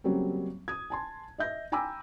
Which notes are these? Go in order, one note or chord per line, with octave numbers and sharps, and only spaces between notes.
C#3 F#3 G3 A#3 C4
D#6 G#6
G#5 A5 C6
D#5 E5 G6 A#6
G5 G#5 A#5 B5 D6 E6